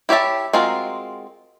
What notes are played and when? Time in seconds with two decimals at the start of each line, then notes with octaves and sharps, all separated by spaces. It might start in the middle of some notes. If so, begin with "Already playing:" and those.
0.09 E4 G4 C#5 E5 A5
0.53 G#3 C4 F4 F#4 A#4